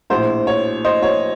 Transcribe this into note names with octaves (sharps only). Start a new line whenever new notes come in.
A#1 A2 C5
C#5
C5 D#5
C#5